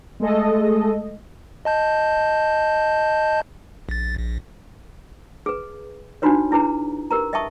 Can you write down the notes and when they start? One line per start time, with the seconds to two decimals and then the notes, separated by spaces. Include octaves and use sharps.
0.20 G#3 A3 A4 D#5
1.65 D#5 A5 G6
3.89 A#1 A6
4.18 A#1
5.46 G#4 B4
6.22 D4 D#4 F4 F#4 B4 C#5
6.51 D4 E4 G#4 B4 A#5
7.11 G4 A#4 B4 A#5
7.33 D#5 E5 G5 A5 C#6 D#6